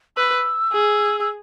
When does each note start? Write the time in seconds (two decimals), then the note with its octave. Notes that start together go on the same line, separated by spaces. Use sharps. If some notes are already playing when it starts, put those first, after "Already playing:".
0.17 B4 E6
0.72 G#4
1.20 E6